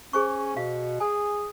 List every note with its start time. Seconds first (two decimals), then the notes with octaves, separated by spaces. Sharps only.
0.13 C#4 G#4 C5 C#6
0.57 B2 F5
1.00 G#4 G#5